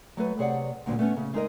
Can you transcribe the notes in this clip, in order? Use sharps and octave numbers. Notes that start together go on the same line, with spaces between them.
F#3 A3 B4
C3 G#4 C#5 D5 F#5
D2 G2 A#2 D3
A3 B3 C#4
C#3
G#3 D#4 A#4 D#5